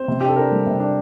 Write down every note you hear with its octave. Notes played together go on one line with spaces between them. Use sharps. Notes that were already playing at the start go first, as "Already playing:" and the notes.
Already playing: C4 C5
C3
D4 G4
A4
D4 A#4
G3
C3
D4